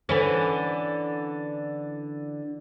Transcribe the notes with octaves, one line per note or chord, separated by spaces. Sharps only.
D3 E3 C#4